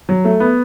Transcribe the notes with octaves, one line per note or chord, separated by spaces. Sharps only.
F#3
A3
B3